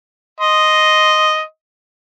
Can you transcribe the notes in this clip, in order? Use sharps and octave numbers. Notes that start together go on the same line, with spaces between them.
D#5 C6